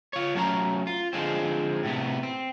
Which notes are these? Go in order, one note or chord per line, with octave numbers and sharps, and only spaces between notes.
F4 C#5
F#3 A3 C#4 G5 A#5
F4
D3 F3 G#3 C4
A2 C3 B3
C4